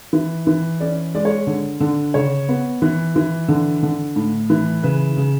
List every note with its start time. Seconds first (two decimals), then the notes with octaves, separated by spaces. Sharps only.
0.13 E3
0.47 E3
0.80 C#4 D5
1.15 G#3 D5
1.25 C#5
1.47 D3
1.80 D3
2.14 C#3 C#5
2.49 B3
2.82 E3
3.16 E3
3.48 D3
3.83 D3
4.16 A2
4.50 E3
4.83 C#3 B4
5.17 C#3